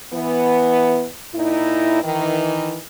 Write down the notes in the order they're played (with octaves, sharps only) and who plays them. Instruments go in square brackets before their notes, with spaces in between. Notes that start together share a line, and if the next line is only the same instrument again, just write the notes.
[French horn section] E3 B3
A#2 D#4 E4
D#3 E3